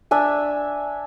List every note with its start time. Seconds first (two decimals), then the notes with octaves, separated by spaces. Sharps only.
0.11 D4 E5 G#5